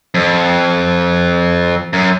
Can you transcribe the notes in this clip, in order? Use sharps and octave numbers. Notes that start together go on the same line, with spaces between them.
F2
F#2